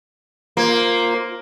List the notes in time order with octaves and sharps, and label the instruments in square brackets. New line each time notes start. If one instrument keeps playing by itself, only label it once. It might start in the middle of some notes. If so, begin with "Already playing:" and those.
[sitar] A#3 [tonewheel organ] F4 A#4 C5